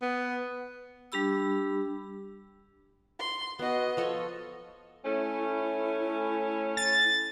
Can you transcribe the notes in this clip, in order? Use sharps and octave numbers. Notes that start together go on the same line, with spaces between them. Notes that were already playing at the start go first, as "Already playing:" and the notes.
B3
G3 D4 G4 B5 E6
C6
B3 F#4 D#5
F3 A4 C#5
A3 C#4 E4
A6